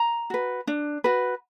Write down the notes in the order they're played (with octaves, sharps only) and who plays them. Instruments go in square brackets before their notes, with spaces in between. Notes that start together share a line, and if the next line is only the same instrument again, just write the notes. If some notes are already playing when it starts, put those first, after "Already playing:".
Already playing: [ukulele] A#5
F#4 B4
D4
F#4 B4